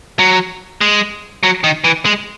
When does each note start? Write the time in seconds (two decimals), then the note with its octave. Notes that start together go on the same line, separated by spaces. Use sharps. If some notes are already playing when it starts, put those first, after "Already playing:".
0.19 F#3
0.81 G#3
1.43 F#3
1.64 D#3
1.84 E3
2.06 G#3